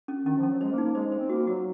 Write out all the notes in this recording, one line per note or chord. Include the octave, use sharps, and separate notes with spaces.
C#4
D#3 C#4
F3
C#4
F#3
G#3 C5
A#3
D#4
A#3
G#3 C5
G#3 C5
C4
A#3 F#4
F#3 F#4